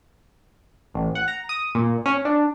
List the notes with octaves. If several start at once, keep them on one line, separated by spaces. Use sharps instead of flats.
A1
F#5
A#5
D#6
A#2
C#4
D4